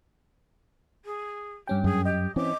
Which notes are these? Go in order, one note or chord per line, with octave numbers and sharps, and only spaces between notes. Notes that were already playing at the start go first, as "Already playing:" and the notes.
G#4
G2 C#4 G4 G5
F#2 G#4
G4 D#5
E3 C4 C#4 D6